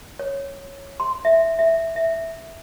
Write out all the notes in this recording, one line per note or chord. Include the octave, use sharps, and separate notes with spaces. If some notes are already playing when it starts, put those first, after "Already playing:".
C#5
C6
E5
E5
E5